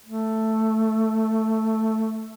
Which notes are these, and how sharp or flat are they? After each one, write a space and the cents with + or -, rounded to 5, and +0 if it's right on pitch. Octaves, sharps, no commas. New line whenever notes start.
A3 +5